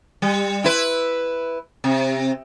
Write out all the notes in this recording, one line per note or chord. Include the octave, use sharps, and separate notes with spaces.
G3
E4 B4
C3